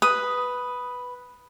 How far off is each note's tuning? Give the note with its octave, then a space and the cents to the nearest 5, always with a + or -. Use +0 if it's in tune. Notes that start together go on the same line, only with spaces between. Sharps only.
B4 +0 D#6 +0